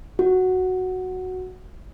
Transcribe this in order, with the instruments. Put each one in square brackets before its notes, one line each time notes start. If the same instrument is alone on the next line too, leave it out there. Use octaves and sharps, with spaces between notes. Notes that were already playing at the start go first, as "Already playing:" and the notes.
[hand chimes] F#4